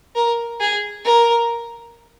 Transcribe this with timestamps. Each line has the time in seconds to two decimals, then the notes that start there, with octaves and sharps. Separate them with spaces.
0.16 A#4
0.60 G#4
1.05 A#4